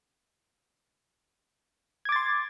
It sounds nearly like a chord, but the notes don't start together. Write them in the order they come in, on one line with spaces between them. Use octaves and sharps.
G#6 D6 A6 C6